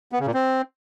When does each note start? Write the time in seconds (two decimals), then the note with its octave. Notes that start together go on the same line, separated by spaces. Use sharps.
0.12 B3
0.19 C#3
0.27 A#2
0.34 C4